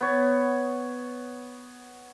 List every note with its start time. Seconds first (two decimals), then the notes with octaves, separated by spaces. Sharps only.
0.01 B3 C#5